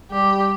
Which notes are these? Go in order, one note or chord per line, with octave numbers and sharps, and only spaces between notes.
G3 G4